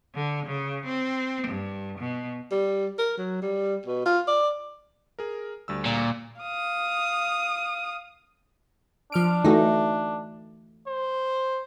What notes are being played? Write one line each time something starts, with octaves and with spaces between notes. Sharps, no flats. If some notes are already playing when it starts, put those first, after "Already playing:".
D3
C#3
C4
G2
B2
G3
A#4
F#3
G3
B2
F4
D5
G#4 A#4
D2 G3 E6
A#2
F5 D#6
F3 D4 F6 D7
E3 A3 D#4 F#4
C5